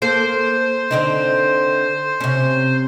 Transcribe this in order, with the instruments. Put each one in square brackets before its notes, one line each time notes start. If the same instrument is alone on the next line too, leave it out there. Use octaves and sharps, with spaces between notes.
[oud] A#3 A4 [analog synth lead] C5
[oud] D3 C4 D#4
C3 C#4